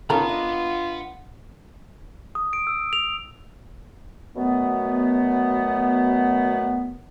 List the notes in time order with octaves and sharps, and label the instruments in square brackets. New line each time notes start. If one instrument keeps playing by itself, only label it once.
[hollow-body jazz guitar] C#3 C#4 D#4 [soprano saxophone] F4 [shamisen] A4 A#4 [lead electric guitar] F#5 B5
[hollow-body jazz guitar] D4 D#5
[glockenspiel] D#6
D7
E6
F7
[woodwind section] F#2 B2 A3 B3